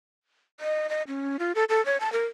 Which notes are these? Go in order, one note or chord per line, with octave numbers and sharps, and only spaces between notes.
D#5
D#5
C#4
F4
A4
A4
C#5
A5
A#4